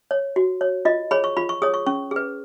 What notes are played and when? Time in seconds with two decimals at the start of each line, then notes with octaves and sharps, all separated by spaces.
0.11 C#5
0.36 F#4
0.61 C#5
0.85 F4 D#5
1.11 G#4 C#5 B5
1.24 C#6
1.37 F4 B5
1.49 C#6
1.62 G#4 C#5 D#6
1.74 C#6
1.86 C#4 C#6
2.11 G#4 B4